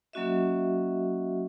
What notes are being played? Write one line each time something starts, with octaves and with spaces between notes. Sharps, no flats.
F#3 A#3 C#4 F#4 D#5 E5